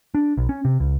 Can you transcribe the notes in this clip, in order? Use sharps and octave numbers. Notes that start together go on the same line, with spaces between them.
D4
B1
C#4
C3
C#2